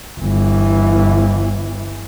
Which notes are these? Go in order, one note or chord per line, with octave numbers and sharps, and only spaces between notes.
G1 E3